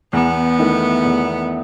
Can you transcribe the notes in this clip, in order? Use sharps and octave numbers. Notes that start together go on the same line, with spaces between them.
E2 B3
D#3 A3 E4
E2